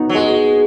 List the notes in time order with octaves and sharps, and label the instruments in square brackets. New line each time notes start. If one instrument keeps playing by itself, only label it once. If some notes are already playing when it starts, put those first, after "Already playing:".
Already playing: [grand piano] B3 D#4 F#4
[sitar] F#3
[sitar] G#3 [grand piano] F#4